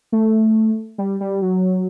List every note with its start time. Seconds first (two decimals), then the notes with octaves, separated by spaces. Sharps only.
0.12 A3
0.98 G3
1.20 G3
1.42 F#3